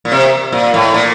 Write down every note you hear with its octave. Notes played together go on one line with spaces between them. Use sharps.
A#2
C3
A#2
A2
A#2